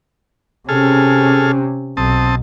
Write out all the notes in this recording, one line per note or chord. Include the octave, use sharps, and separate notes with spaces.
C3 C#4 G#4 A4 F6
B1 C4 A5 D#6